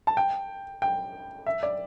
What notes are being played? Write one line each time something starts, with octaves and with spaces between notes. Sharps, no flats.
A5
G5
G5
E5
D5